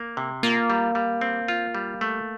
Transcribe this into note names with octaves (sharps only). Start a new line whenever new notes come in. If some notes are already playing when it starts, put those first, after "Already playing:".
Already playing: A#3
C3
A#3 F4
G3
G3
C4
F4
G3
A3